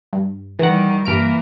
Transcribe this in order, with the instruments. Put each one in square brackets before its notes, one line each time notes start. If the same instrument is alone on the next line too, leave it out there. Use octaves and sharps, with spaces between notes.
[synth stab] G2
[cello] D#3 G3 [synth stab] E3 F#5
[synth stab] G2 F6 D7 [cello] E3 A#3